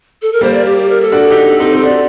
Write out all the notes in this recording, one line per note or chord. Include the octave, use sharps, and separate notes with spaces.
A4
A#4
G3 A#3 C5
D5
G4
G4
A#4
A4
D4 F#4
D#4 G4
C4 D#4
C4 D#4
D4 F#4 D5